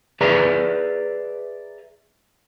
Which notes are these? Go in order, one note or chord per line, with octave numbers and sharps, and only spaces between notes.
G#4 B4 D5 E5 A#5